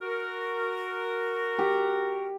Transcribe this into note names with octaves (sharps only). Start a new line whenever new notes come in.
F#4 A#4
G4